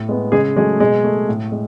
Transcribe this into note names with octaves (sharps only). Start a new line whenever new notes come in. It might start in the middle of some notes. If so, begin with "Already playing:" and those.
Already playing: A2
G#3 B3
C#3 G#3 G#4
F#3 G#3 A3 G#4
B2 G#3 G#4
A3
A2
G#3